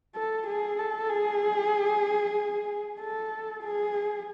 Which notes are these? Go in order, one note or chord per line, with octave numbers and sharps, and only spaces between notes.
A4
G#4
A4
G#4
A4
G#4